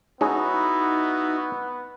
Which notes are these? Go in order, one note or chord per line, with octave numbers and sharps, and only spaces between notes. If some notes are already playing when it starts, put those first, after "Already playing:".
G#3 B3 C#4 D#4 E4 F#4 G#4